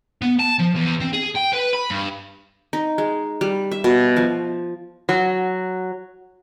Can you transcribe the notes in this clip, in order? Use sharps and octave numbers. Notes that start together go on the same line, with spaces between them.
B3
A5
F3
E2
C4
G#4
G5
B4
B5
G2
D#4
G#3
G3
E5
B2
F3
F#3